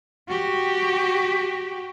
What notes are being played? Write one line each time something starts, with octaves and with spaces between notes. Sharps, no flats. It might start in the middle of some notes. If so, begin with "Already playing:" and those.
F#4 G4